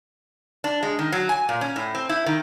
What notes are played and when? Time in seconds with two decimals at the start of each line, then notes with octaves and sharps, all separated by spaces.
0.64 D4
0.83 G#3
0.99 D#3
1.12 F#3
1.29 G#5
1.49 A#2
1.61 C#4
1.76 A2
1.95 C4
2.09 E4
2.26 D#3